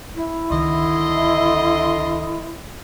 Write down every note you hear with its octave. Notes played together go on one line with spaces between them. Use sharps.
E4
C#2 D3 D#3 D#5 C6